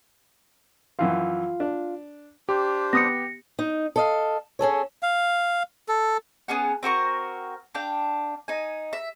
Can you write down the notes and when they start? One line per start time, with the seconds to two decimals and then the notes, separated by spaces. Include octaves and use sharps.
0.99 F#2 E3 F3 F4 F5
1.60 D4
2.49 D4 G4 C5
2.93 B3 D#6 A#6 C#7
3.59 D#4
3.96 A4 D#5 F5
4.59 C#4 G#4 A4 C#5
5.03 F5
5.89 A4
6.48 B3 C#4 G#4 F#5
6.83 C4 F#4 A#4 C#6
7.75 D4 F5 G5
8.48 D#4 G#5
8.93 E5